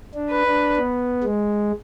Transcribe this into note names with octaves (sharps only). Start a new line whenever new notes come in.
D4
B4
D4
B3
G#3